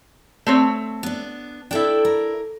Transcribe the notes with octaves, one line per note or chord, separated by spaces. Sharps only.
A3 C4 C#5
B3 D4
D4 E4 A4 G5
A#4